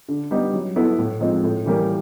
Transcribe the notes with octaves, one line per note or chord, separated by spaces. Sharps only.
D3
G3 B3 D#4
F#3
B3 E4 A4
A2
F3 G#3 C4 D#4
A2
E3 G3 A#3